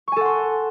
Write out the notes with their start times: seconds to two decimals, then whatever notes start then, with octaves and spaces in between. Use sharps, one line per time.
0.08 C#6
0.12 G#5
0.16 A4
0.21 F#5
0.25 C6